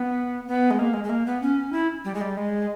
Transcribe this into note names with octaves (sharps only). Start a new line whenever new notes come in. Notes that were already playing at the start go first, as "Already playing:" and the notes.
Already playing: B3
B3
G#3
A#3
G#3
G#3
A#3
B3
C#4
E4
G3
G#3
G3
G#3